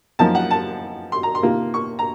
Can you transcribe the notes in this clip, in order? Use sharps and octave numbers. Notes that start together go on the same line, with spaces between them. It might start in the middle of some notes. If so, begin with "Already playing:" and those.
F#2 F3 A#3 D#4 A5
F#5
A5
C6
A#5
C6
C3 D#3 A#3 F4
C#6
A#5